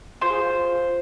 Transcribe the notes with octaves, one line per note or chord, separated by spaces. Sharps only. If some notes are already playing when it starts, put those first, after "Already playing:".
F4 C5
G#4
F4